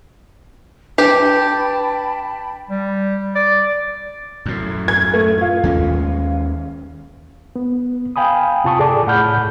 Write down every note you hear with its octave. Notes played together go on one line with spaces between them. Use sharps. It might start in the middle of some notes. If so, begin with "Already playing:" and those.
D4 G4 B4 G5 A5 B5
G3
D5
F#2 A2
G#6
A3
F4
D#2 G#3 C#4
B3
F5 G5 G#5 B5 D#6
C3 F4 A5 C#6 D#6
A2 G#4 A4 D5 A5 D6
C#2 A2 F#5 B5 F6 G6